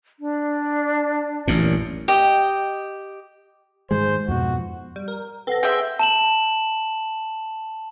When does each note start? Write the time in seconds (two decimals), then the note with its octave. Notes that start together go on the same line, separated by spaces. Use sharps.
0.19 D4
1.48 A1 F#2 A#2
2.08 G4 D#5
3.91 G#2 D#3 G#3 C5
4.28 F2 G#2 B2 F#4
4.96 G3
5.08 A#4
5.47 C4 A4 B4 F#5 A#6
5.63 G#4 E5 G5 C6 G#6
5.99 A5 E7 F#7